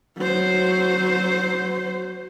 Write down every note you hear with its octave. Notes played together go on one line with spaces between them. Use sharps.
F#3 C5